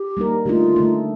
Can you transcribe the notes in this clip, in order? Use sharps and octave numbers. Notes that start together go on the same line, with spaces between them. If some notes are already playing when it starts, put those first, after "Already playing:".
Already playing: G4
G3 A#3 D#4 A#4
D3 A3 D#4 F4 G4
D3 A3 D#4